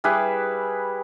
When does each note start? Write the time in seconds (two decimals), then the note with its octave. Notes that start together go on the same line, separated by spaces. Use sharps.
0.04 G3 E4 G#4 B4